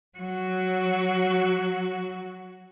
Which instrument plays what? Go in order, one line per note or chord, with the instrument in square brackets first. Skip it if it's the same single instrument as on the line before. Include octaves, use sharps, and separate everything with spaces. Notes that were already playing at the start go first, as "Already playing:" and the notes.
[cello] F#3 F#4